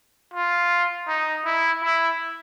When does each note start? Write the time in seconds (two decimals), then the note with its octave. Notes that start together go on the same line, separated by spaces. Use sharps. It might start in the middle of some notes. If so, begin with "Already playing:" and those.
0.34 F4
1.08 D#4
1.46 E4
1.83 E4